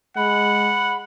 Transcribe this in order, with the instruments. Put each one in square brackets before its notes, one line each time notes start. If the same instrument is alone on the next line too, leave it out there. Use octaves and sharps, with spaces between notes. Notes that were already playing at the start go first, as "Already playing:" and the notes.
[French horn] G#3 [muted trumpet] F#5 [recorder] B5